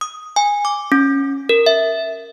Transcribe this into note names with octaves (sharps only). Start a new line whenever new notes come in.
D#6
G#5
D6
C#4
A#4
E5